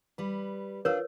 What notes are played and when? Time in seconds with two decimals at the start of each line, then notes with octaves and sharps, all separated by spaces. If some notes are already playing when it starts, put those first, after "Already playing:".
0.18 G3 B4
0.85 D4 F4 A#4 B4 C#5